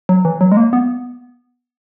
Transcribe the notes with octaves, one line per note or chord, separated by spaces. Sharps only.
F#3
E3
F#3
G#3
A#3
B3